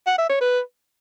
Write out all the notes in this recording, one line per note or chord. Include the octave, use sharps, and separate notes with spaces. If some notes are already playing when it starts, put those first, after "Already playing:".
F#5
E5
C#5
B4